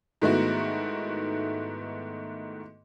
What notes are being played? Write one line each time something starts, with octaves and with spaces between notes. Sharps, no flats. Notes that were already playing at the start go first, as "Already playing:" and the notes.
G#2 D#3 A3 B3 E4 F#4